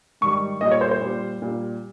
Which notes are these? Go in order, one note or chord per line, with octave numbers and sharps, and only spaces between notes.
G#2 D#3 G3 C#6
A#2 G3 D#5
C#5
C5
C5
A#2 G3
A#2 G3